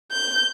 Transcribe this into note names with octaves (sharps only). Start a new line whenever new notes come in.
G6